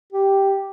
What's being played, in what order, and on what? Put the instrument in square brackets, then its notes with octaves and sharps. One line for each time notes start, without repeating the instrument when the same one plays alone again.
[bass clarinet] G4